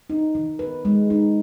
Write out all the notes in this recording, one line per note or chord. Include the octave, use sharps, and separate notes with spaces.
D#4
D#3
B4
G#3
D#4